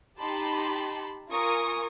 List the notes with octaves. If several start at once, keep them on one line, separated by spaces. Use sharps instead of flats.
D#4 G4 A5 B5 C6
F4 A#4 G#5 C#6 D#6